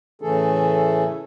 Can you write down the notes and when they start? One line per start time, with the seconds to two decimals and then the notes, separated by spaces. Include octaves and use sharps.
0.22 A2 C#3 E3 A3 G#4 A4